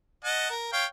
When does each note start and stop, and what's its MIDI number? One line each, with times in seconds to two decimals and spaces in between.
0.25 0.50 75
0.25 0.50 78
0.25 0.50 81
0.50 0.73 70
0.73 0.85 73
0.73 0.85 77
0.73 0.85 79